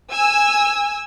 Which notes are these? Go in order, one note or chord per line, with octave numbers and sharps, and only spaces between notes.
G#5 E6